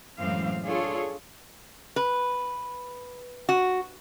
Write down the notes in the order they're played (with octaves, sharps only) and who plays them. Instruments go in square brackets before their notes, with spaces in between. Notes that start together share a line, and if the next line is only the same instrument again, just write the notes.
[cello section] F#2 A2 E3 G#3 C4 F5
D4 F4 G#4 A4 C#5
[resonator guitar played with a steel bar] B4
F#4